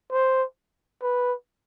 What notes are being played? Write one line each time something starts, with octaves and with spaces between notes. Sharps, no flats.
C5
B4